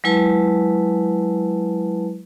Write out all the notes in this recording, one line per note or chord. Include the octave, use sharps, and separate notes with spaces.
F#3 G#3 E4 B4 A5